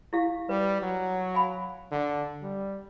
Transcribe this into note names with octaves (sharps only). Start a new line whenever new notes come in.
E4 G4 F5
G3 B4
F#3
F5 G#5 B5
D3
G3